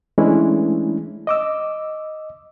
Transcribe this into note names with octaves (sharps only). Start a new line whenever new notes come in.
E3 G#3 A3 C#4 D4 E4
D#5 D6 E6